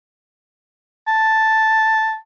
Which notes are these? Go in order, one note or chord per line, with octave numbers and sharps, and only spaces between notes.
A5